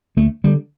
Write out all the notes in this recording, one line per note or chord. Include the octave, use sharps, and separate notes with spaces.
D2 A3
D3 G3